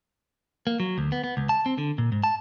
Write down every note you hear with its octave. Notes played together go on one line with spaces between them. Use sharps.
A#3
F#3
D2
B3
B3
C#2
A5
C4
D3
A#2
G#2
A5